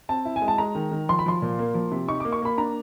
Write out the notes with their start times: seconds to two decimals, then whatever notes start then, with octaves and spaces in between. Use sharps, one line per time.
0.09 C4 A5
0.25 E4
0.36 G#5
0.42 G#3
0.48 A5
0.58 G#3 A#5
0.75 D#3
0.92 D#3
1.09 F3 C6
1.19 B5
1.26 F3 C6
1.42 A#2
1.59 A#3
1.74 F3
1.91 C3
2.08 D#4 C#6
2.20 A#3 D6
2.32 C#6
2.42 A#3 B5
2.58 D4 A#5